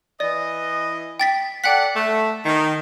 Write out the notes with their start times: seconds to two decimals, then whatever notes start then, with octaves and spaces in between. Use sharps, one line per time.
0.20 E3 D5 D#5
1.20 G5 A6 B6
1.64 A4 D5 F#5 G5 B6
1.95 A3
2.44 D#3